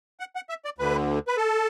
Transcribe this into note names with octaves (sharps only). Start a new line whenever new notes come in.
F#5
F#5
E5
D5
D2 D3 B4
B4
A4